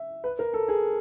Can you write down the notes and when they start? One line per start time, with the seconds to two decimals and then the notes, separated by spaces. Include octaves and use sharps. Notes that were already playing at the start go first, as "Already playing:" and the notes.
Already playing: E5
0.24 B4
0.39 A#4
0.54 A4
0.68 G#4